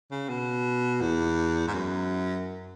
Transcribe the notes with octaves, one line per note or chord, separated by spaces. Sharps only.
C#3
B2
E2
G#2
F#2